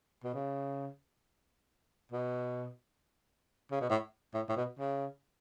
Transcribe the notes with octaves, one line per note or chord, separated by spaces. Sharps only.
B2
C#3
B2
C#3
B2
A2
A2
A2
B2
C#3